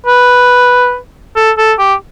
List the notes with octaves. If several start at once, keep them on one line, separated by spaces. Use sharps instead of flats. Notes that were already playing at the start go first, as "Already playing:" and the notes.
B4
A4
A4
G4